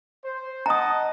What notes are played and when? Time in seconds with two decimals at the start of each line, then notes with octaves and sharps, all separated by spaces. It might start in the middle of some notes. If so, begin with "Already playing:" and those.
0.24 C5
0.66 D#5 F#5 A5 A#5 D#6